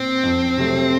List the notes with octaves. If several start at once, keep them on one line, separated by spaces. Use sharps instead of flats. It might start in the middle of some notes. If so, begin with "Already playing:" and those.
Already playing: A#2 C4
F2
C3 F#3 A3